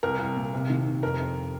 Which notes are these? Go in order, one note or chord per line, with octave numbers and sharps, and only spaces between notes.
C2 A#4
C2
A#2
C3
D#3
C3
F2 A#4
F2